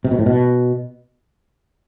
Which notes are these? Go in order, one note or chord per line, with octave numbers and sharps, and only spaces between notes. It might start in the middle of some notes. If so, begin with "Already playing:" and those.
C3
B2
A2
B2